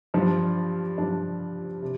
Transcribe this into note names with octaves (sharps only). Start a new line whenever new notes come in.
G2 F3 D4
G2 F3 D4
C3